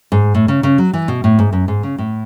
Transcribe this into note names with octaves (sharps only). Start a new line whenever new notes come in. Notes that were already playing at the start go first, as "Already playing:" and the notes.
G#2
A2
C#3
C#3
F#3
E3
B2
A2
G#2
F#2
G#2
C#3
A2